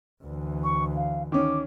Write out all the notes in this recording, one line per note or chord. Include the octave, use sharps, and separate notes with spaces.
D2 E3
C#6
F5
D#3 C#4 D6